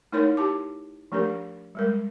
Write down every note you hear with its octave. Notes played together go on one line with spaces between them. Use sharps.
A3 D#4 E4 A#4 C#5 C6
E4 G4 A5 D6
F3 A3 D4 G4 A#4
G3 G#3 A#4